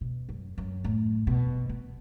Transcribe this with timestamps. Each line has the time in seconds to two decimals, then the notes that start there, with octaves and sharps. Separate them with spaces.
0.01 B2
0.29 F#2
0.58 F#2
0.84 A2
1.27 B2
1.69 B3